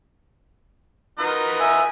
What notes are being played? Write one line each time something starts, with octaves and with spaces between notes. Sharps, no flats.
D#4 F4 F#4 A#4 B4
E5 G#5